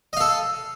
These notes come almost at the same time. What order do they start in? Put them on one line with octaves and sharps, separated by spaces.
D#5 F5 A4